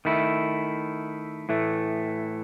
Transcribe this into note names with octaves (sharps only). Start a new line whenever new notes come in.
D#3 A3 E4
A2 E3 A3